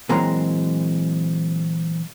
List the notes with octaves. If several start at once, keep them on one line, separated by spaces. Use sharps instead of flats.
A#2 E3 F#3 G#3 C4 A#5